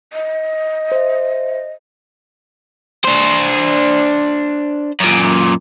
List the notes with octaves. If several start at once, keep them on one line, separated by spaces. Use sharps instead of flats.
D#5
C5 E5
D4 C5
F#2 A#2